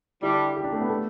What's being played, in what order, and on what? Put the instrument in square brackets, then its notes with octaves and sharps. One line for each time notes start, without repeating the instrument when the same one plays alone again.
[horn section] D3 G3 D4 [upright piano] E4
[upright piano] G4
D4
A3
B3
A3